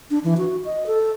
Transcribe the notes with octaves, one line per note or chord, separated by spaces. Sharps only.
D4
E3
F#4
D#5
A4